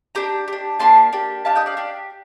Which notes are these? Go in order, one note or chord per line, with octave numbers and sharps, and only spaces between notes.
D4 G4 A#5 D6
D4 G4
A#3 D4 G4 A5 C6
A#3 D4 G4
D4 G4 F5 A5
D#5 G5
D5 F5
D4 G4